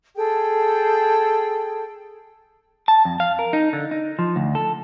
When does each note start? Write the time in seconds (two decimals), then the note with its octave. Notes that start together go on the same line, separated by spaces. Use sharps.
0.15 G#4 A4 G5
2.88 A5
3.05 F2
3.20 F5
3.39 A#4
3.53 D#4
3.73 D3
3.91 D#4
4.19 F3
4.36 D2
4.55 A4